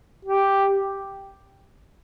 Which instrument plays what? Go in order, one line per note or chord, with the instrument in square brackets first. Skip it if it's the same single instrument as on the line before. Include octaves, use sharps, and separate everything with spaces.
[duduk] G4